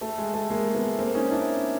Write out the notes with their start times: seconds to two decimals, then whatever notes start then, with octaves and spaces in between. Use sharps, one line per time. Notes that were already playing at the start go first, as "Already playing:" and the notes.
0.01 A3
0.18 G#3
0.34 A3
0.50 G#3 A#3
0.75 A3 B3
0.98 A#3 C4
1.15 C#4 D#4
1.31 D4 E4